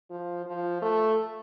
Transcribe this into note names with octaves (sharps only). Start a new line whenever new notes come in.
F3
F3
A3